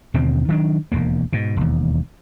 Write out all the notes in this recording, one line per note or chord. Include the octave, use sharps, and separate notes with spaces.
D#2 B2 D3 C4
D#3 F#3 D4
E1 D#2 A#3
G#2 B2
E1 D#2